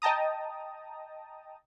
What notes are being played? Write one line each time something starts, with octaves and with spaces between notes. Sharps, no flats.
D#5 G5 A5 A#5 D#6